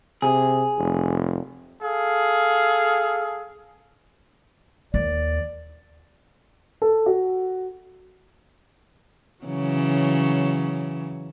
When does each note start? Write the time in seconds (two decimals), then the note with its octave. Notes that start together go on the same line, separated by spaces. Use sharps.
0.22 C3 G#4
0.78 F1
1.82 G#4 A4 F5
4.94 D#2 D5
6.82 A4
7.06 F#4
9.45 C#3 E3 F#3